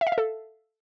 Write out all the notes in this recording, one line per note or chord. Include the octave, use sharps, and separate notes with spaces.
E5
F5
E5
A4